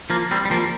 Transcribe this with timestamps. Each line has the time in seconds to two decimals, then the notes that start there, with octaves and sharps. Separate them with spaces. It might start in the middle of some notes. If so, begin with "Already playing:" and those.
0.10 F3 A#3
0.31 G3 C4
0.45 G3
0.51 F3 A#3